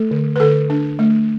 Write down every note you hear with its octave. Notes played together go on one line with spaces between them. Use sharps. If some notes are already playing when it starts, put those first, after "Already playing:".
Already playing: A3 A4
D3
B4
D3 A4
D4
A3